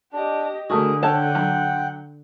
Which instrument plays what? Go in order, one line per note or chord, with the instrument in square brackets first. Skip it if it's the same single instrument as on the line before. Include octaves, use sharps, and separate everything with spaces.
[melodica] D4 [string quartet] G4 D#5
[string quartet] D3 [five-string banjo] A3 F#4 [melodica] G#4 A#4
[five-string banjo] A4 C#5 A5 [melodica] F#5 G5
[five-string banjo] F3 F#3